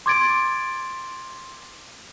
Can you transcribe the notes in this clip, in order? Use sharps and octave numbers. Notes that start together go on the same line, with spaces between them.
C6 D6 G#6 A6 D7